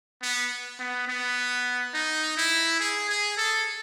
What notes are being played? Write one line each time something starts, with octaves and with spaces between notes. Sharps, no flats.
B3
B3
B3
D#4
E4
G#4
G#4
A4